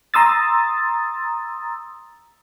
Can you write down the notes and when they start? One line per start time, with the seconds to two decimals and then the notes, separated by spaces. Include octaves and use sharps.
0.14 A#5 C6 D#6 E6 A6